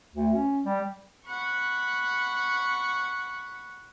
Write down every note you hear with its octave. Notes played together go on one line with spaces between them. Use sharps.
D2
C#4
G3
F#5 B5 C#6